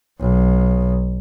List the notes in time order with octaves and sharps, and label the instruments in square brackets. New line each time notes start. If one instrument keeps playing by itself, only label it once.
[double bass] B1